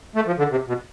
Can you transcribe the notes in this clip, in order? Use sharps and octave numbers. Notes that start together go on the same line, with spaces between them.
A3
F3
D3
C3
B2